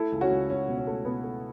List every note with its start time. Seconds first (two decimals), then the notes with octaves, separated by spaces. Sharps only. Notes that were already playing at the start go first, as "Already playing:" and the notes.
Already playing: A3 E4 A4
0.12 C#2
0.21 C#4 F#4
0.31 C#2
0.50 C#2 C#4
0.68 B2
0.78 C#4
0.87 A3
1.05 B2 B3
1.24 A3